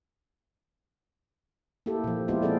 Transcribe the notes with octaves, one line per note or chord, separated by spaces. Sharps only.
A#3 E4 G4 A4
A#2 F3
F3 G#3 B3 E4 F4 G4
C4 F4 G#4 A4 D5